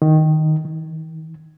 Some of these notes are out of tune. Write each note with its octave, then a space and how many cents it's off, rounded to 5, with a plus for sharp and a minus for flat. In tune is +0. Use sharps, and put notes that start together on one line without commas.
D#3 +0
D#3 +45